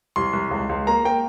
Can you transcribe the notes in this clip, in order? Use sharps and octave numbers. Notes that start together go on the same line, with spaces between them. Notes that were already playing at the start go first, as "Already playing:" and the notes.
C2 C6
C2
C#2
C#2
A#3 A#5
A#3 G5